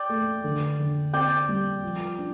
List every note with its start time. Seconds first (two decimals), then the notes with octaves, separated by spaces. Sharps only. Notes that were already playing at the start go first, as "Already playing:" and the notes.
Already playing: D5 G5
0.09 A3
0.44 D3
0.79 D3
1.13 C4 D5 G5
1.49 G3
1.83 F3
2.18 D4